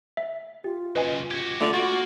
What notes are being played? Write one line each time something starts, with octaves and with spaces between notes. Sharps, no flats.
E5
F4 G4
F#2 C#3 B4 D#5 G#5
F#4 G4 G#6
D3 A3 D4 F4 D5
A#3 F#4 A6